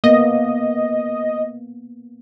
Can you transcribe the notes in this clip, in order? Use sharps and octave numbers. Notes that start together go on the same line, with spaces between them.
A#3 B3 D#5